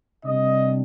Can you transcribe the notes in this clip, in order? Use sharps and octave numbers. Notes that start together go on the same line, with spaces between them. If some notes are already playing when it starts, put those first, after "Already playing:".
C3 G3 D4 D#5